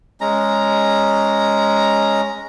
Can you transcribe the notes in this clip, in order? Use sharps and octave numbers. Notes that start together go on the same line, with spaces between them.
G#3 C#4 A#5